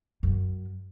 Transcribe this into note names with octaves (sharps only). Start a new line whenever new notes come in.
F#2